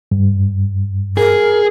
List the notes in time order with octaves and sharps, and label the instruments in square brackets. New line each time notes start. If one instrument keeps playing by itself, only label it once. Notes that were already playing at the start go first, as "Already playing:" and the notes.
[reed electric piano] G2
[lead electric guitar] G#4 [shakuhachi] A#4